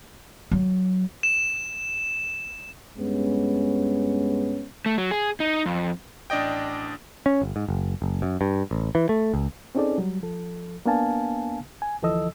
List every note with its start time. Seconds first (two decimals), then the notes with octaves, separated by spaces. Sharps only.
0.51 F#3
1.23 E7
2.97 G2 G#3 B3 C#4
4.86 A3
4.98 F#3
5.11 G#4
5.40 D#4
5.66 F2
6.30 A1 D4 D5 D#5 G5
7.26 C#4
7.41 G1
7.56 G#2
7.68 F#1
8.02 F#1
8.22 F#2
8.41 G2
8.71 A1
8.95 E3
9.09 A3
9.34 C#2
9.75 C4 C#4 D#4 G#4 A4 D5
9.98 F#3 G3
10.23 F3 A4
10.86 A#3 B3 D4 F5 G#5 A5
11.82 G#5
12.02 D2 E3 F3 A4 D#5 E6